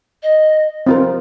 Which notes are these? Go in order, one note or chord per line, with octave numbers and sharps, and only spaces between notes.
D#5
C4 F4 A#4